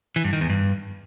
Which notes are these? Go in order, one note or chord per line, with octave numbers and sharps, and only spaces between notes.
E3
G2
D#3
E2
G2